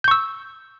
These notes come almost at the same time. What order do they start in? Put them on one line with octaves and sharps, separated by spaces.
G6 C#6 E6